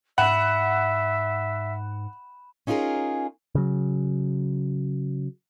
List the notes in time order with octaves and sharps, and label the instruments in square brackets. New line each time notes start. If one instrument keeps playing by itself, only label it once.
[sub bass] G#2 [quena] E5 [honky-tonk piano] F#5 [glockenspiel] B5 E7
[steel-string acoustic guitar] C#4 D#4 F4 G4 G#4 A#4
[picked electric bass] C#3 F#3